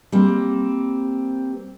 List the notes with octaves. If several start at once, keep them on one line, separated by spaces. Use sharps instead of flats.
G3 A#3 C4